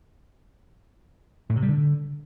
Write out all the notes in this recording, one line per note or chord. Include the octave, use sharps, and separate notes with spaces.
A2
C3
G3
D3